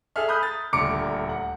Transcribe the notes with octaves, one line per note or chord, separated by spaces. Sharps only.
G#4 A4 E5 F6
A#5 B5 D#6 F#6 G6
A6
D#1 D2 A#5 D6 C#7 D7
F#5